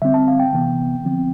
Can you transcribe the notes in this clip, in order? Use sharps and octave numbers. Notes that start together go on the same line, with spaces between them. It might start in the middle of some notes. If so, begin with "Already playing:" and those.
D3 G3 C4 E5
A5
F5
G5
C3 E3 B3
D3 F3 C4